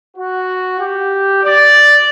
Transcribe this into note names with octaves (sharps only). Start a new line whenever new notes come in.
F#4
G4
D5